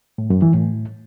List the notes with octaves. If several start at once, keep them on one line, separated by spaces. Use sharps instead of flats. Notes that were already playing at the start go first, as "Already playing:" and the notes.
A2
F#2
E3
A2